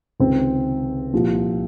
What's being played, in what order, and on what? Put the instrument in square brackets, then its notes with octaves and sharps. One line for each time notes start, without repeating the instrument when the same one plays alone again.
[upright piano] C#2 C3 D#3 C4
C2 A#2 F3